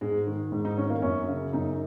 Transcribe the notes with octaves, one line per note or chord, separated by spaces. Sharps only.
G#2 G#3
D#3
G#2
D#4
D#3 C#4
A#3
F#2 C#4
C#3
F#2 D#4